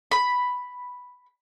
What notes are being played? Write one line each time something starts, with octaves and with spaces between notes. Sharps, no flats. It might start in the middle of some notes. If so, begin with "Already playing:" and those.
B5